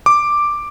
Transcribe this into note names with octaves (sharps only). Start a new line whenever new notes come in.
D6